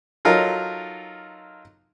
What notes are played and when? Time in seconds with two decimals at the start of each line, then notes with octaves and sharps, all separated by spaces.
0.25 F#3 D#4 F4 A4 A#4